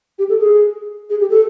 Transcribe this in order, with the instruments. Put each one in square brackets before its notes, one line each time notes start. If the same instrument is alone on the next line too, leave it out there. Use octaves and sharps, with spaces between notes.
[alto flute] G4
A4
G#4
G#4
G4
A4